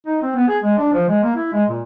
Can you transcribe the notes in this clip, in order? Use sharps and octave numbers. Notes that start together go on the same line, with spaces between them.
D#4
C4
B3
G#4
G#3
D4
F3
G#3
A#3
E4
G#3
A#2